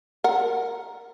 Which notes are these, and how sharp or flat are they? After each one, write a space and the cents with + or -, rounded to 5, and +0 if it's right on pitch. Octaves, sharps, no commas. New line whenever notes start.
A#4 +0 F#5 +0